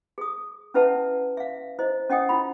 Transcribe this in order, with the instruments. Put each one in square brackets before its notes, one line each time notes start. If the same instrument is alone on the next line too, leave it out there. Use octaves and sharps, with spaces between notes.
[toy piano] G#4 D#6
C#4 E4 B4 E5 F#5 A5
E5 F5
E4 C5 D#5
C#4 D#5 F#5 G5 D#6
E4 F4 B5